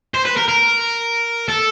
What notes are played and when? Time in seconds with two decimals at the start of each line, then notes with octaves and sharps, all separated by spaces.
0.14 C5
0.25 B4
0.37 A#4
0.48 A#4
1.48 A4